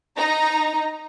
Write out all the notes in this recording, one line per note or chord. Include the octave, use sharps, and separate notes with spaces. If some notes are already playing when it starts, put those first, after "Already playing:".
D#4 A#5